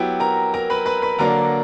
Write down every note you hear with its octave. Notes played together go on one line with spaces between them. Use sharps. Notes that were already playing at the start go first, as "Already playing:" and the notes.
Already playing: F#3 B3 E4 G4 G5
A#4 A#5
A#4 A#5
B4 B5
B4 B5
B4 B5
D3 F#3 A#3 D4 A#4 A#5